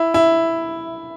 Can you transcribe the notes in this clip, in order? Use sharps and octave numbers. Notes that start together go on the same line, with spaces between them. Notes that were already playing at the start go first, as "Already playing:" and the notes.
Already playing: E4
E4